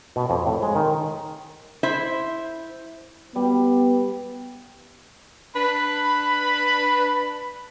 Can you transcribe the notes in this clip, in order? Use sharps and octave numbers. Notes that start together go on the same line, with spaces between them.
B2
F2
A2
G#3
D#3
E4 C5 E5
G3 B3
D4 B4 B5